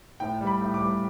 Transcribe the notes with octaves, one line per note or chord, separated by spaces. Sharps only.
A2 G5
G3
B5
A2
D6
G3